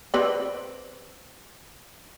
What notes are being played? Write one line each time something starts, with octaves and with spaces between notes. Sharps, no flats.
C4 B4 D5